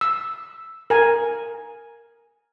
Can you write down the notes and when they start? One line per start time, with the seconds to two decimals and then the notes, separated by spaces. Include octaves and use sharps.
0.01 E6
0.90 A#4 G#5